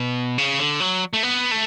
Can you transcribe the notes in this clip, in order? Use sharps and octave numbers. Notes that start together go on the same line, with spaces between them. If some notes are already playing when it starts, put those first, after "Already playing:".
Already playing: B2
C#3
D3
F#3
A3
B3
A3